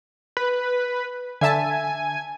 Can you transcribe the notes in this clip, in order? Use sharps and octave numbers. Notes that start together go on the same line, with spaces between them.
B4
D3 E5 G#5 A5